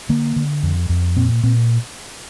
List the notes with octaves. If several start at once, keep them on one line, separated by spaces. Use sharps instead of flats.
D3 A#3
D3
F2
F2
A#2 C4
A#2 C4